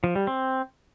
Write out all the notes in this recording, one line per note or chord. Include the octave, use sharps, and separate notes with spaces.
F3
G3
C4